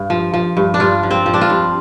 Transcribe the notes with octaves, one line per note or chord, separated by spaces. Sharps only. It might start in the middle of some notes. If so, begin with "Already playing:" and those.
Already playing: G2
F3
F3
G2
D4
G2 F4
F3
C4
F3
D4
F4
G2